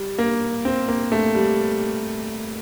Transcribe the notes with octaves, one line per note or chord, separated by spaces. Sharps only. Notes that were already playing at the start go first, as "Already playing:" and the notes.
Already playing: G3
A#3
C4
A#3
A3
G3